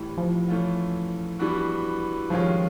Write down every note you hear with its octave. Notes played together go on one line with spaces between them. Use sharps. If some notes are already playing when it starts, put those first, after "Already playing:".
Already playing: A2 E3 G3
F3
E3 A3 C#4 F4
E3 G3 B3 D4 F#4
G2 D#3 F3 G#3 C#4 F4